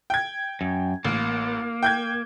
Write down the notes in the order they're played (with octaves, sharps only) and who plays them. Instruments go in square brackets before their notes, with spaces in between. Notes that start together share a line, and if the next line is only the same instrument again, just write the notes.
[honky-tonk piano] G5 G#6
[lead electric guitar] F#2
[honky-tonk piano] A1 [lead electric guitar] A#3
[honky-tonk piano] G5 G6 G#6